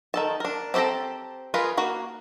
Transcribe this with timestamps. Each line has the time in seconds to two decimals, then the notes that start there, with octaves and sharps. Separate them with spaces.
0.14 D#3 A4 A5
0.40 D4 A#4
0.74 C4 G4 A4 A5 A#5
1.54 F4 G#4 A#4 B4
1.77 A#3 F#4